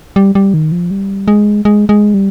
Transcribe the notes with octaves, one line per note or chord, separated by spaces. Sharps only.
G3
G3
D#3
F3
G3
G#3
G#3
G#3
G3